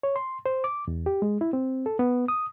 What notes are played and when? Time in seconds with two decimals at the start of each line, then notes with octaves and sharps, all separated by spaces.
0.03 C#5
0.16 C6
0.46 C5
0.64 D6
0.88 E2
1.06 G4
1.22 G#3
1.41 E4
1.53 C4
1.86 A4
1.99 B3
2.28 D#6